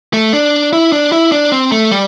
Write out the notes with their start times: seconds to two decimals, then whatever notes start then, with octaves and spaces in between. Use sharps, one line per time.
0.13 A3
0.33 D4
0.73 E4
0.92 D4
1.12 E4
1.32 D4
1.52 C4
1.72 A3
1.92 G3